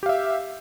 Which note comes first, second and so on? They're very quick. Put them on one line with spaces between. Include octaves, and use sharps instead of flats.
G4 F5 E5